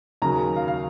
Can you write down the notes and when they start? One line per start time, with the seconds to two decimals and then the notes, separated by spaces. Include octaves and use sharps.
0.22 D#2 C#3 F#3 A#5
0.56 F5
0.68 F5